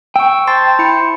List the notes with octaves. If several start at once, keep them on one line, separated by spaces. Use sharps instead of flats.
G5 C#6 E6
C5 A5 C6 A6
E4 C#7